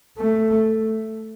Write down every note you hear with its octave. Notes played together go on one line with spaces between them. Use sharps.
A3